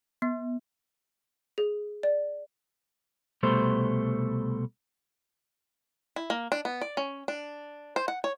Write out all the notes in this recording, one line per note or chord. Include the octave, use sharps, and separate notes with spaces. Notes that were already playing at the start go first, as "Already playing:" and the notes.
B3
G#4
D5
C2 B2 G3 A3 C5
E4
A#3
D4
B3
D5
C#4
D4
C5
F#5
C#5